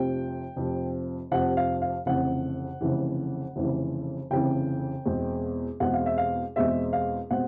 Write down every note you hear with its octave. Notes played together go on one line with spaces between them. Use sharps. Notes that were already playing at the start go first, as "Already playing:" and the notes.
Already playing: F1 F2 C3 F3 G5
F1 F2 C3 F3
F1 F2 C3 F3 F#5
F5
F5
F1 F2 C#3 E3 F#5
F1 F2 C#3 E3
F1 F2 C#3 E3
F1 F2 C#3 E3 G5
E2 B2 G#3 C4
E2 B2 G#3 C4 F#5
F5
E5
F5
E2 B2 G#3 C4 E5
F5
B2 G#3 C4 F#5